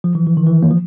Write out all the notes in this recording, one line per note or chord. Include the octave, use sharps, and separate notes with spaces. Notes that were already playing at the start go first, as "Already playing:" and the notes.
F3
E3
E3
D#3
E3
A#3
F3